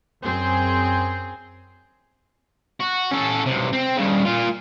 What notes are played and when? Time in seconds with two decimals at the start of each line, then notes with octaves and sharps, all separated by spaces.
0.21 F#2 C4 G#4
2.80 F#4
3.11 C#4 A4
3.46 B1 C3
3.73 C4
3.97 G2 C#3
4.25 A#2 F4